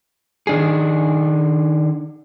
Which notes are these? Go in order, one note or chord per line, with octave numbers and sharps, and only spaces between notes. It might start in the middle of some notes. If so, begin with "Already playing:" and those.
D#3 D4 G#4